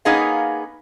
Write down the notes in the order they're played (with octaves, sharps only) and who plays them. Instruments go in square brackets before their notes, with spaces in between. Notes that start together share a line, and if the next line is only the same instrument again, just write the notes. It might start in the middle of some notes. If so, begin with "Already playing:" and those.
[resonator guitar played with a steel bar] A#3 B3 C#4 D#4 G#4 F5